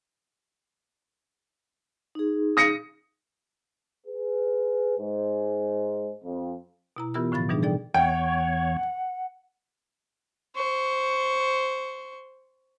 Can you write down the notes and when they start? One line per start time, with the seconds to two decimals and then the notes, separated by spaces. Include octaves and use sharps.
2.15 D#4 G#4
2.57 D#6 A#6 C#7
4.07 G#4 B4
4.99 G#2 G#3 C5
6.24 F2
6.96 B2 E4 A#5
7.14 E3 B3 F4 G4 A#4 E6
7.32 A2 D3 F3 B5 A6
7.49 B2 E3 G3 D4 D#4 G#4
7.62 G#4 A4 D5 G5
7.94 E2 C#5 F#5 G5
10.56 C5 C#6